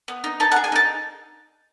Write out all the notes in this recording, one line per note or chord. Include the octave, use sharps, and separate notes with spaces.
B3
D#4
D#4 A5
F#5
G#4
G#5
D#4 A5